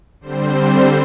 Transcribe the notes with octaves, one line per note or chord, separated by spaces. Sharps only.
D3 G3 C4 C5